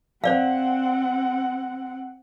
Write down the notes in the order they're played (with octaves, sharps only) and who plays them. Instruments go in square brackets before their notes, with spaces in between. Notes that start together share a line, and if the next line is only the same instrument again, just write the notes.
[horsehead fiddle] C4 F#5 [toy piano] C5 D5 F5